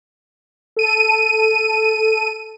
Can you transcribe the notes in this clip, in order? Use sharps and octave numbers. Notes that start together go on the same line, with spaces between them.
A4 D#7